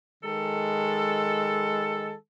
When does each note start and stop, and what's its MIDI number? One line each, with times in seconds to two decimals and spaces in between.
0.23 2.14 51
0.23 2.14 56
0.23 2.14 69